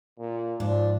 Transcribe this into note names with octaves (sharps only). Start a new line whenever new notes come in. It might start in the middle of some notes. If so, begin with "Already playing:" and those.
A#2
G#2 F3 D4